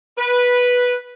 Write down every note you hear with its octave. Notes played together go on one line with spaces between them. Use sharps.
B4